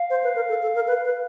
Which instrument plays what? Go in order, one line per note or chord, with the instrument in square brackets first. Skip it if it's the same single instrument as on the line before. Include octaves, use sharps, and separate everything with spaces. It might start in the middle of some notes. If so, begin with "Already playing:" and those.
Already playing: [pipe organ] F5
[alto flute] C5
B4
A#4
A4
A4
A#4
B4
B4